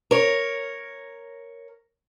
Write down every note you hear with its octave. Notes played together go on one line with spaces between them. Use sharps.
A#4 C#5